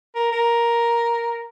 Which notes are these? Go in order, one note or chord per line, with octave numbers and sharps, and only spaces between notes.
A#4
A#4